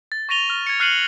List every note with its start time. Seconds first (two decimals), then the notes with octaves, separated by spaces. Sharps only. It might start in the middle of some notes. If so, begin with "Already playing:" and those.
0.12 A6
0.29 C#6 A6 A#6 D#7 F7 G7
0.50 F6 G7
0.67 G#6 C#7
0.80 F6 F#6 C7 C#7 D#7 F#7